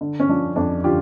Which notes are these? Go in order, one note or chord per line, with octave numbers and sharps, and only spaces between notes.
D3
C#4
F3 D4
F2 D4
D3 F4 G4